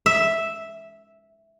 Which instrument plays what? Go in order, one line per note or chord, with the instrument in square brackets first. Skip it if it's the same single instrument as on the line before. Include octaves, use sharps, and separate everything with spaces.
[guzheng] E5